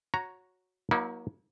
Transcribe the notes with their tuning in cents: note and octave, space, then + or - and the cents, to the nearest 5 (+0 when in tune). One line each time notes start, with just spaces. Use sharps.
F#4 -10 C#5 +0 A#5 +0
F#3 +0 A#3 +35 E4 -40